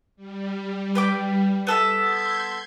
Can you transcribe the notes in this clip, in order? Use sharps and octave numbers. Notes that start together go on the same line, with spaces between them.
G3
B4 G5 D6
B3 A4 E5
C6 G6 G#6